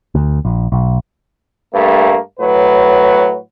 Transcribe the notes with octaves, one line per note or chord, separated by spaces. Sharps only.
D2
A#1
B1
G2 A3 A#3
A2 F#3 B4